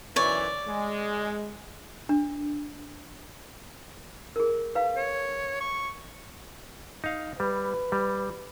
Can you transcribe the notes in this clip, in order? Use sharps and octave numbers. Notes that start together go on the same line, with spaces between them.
B1 F#2 E3 C#5 D5
G#3
D4
G#4 A#4
B4 F5
C#5
C#6
D#4 F5
G3 B4
G3